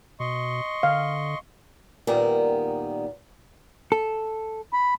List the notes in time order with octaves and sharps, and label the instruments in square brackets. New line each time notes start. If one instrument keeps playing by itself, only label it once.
[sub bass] B2 [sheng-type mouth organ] D#5 C6 C#6
[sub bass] D3 [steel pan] F5
[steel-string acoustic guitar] A#2 D#3 G3 B3 A#4
[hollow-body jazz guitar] A4
[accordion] B5